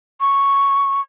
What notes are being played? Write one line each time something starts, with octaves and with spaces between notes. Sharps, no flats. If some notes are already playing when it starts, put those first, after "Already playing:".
C#6